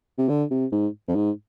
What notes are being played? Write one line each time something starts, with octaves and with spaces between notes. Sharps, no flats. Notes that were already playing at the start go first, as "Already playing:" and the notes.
C3
D3
C3
G#2
F2
G#2